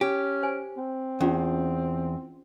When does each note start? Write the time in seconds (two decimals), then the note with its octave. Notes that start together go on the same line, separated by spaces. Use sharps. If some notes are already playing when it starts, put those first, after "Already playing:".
0.01 C#4 G4
0.43 C5 G#5
0.77 C4
1.21 E2 C#4 F4 G4